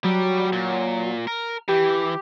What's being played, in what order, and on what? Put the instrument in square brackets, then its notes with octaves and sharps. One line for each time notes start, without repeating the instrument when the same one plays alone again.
[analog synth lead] F#3 [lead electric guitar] G3 G4
[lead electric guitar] A#2
A#4
[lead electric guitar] E3 [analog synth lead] G4